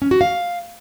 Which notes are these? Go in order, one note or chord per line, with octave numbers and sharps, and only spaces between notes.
C#4
F#4
F5